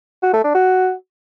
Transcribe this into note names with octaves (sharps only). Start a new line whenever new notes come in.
F#4
A3
D4
F#4